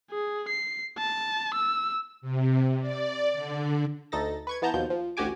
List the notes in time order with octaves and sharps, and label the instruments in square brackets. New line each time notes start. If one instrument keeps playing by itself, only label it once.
[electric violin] G#4
C7
A5
E6
[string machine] C3
D5
D3
[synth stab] D2 D#4 A4 A6 A#6
B4 C#6 G#6
E3 B3 A5 A#5 G6
D#2 B2 F3 G6
F3
A1 D2 F#4 G4 G#5 D6